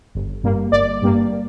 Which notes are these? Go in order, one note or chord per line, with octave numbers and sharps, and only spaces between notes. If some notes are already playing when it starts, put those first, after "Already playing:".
G1
G2 G3 A#3
G1 D5
G2 G3 A#3